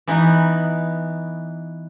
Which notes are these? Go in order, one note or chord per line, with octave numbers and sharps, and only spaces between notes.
E3 B3 D#4